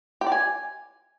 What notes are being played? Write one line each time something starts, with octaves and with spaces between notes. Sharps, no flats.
G4
D5
G#5